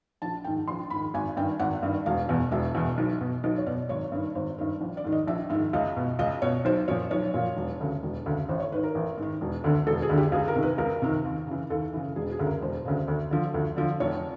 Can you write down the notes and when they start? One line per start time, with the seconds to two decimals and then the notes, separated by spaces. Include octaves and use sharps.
0.22 A#1 A5
0.44 G#2 D#3 G5
0.68 A#1 C6
0.90 G#2 D#3 B5
1.14 G#1 G#5
1.37 G2 D#3 G5
1.60 G#1 F#5
1.83 G2 D#3
2.06 E1 F5
2.29 E2 B2
2.52 E1 E5
2.75 E2 B2
2.98 B1
3.21 B2
3.43 B1 D#5
3.58 C#5
3.66 B2 D5
3.89 G#1 C#5
4.12 G2 D#3
4.35 G#1 C5
4.58 G2 D#3
4.81 A#1
4.97 D5
5.04 G#2 D#3
5.12 D#5
5.27 A#1 E5
5.50 G#2 E5
5.55 D#3
5.73 C#2 D#5
5.96 B2
6.19 C#2 D#5
6.42 B2 C#5
6.65 B1 C5
6.88 A#2 F3 C#5
7.11 B1 C#5
7.34 A#2 F3
7.56 E1
7.80 D2 C#3
8.03 E1
8.26 D2 C#3
8.49 A1 C5
8.60 C#5
8.72 G#2 D#3 B4
8.84 A#4
8.95 A1
9.18 G#2 D#3
9.41 E1
9.64 D2 D3
9.87 E1 A4
10.02 G#4
10.10 D2 D3
10.18 G4
10.32 C#2 G#4
10.48 A#4
10.55 C3 D#3
10.63 B4
10.78 C#2 A#4
11.02 C3 D#3
11.24 D#2
11.47 C#3 E3
11.70 D#2 A4
11.93 C#3 E3
12.16 E1 G#4
12.32 G#4
12.39 D2 C#3
12.46 A#4
12.62 E1 C5
12.85 D2 C#3
13.08 D2
13.31 D3 F3
13.54 D2
13.77 D3 F3
14.00 F1 C#5